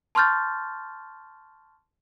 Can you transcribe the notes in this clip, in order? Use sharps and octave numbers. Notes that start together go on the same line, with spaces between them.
A5 C6 C#6 F6 G6 A6